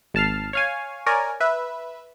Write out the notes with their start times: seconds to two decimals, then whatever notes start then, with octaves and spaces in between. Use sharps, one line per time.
0.14 G#1 A5 F6 C7
0.53 C#5 F5 G#5
1.06 A#4 C#5 D5 G#5
1.40 B4 E5